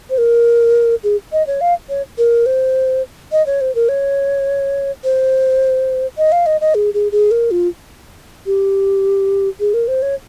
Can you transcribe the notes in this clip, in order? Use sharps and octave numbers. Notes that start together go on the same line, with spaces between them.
C5
A#4
G#4
D#5
C#5
F5
C#5
A#4
C5
D#5
C#5
C5
A#4
C#5
C5
D#5
F5
D#5
D#5
G#4
G#4
G#4
A#4
F4
G4
G#4
A#4
C5
C#5